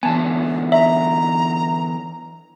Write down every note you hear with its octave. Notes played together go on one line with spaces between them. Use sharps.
D3 E3 B3 G#5 A5
D#5 E5 A#5